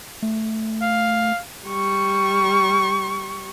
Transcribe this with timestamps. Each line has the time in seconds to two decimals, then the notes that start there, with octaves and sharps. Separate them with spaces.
0.22 A3
0.82 F5
1.67 G3 C#6